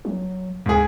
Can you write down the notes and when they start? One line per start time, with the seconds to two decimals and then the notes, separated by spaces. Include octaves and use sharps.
0.05 F#3
0.66 D2 G#2 G#4